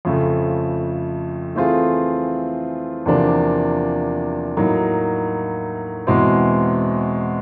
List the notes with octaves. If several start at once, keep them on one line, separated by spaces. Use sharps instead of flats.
F2 C#3 F3 A3
E3 A3 C4 F4 G#4
E2 C3 F3 A#3 D4
A2 F#3 A#3 D#4
E2 B2 G#3 C4 E4